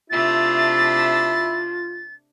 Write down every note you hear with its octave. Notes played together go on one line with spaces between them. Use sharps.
C3 A3 D4 E4 F4 A6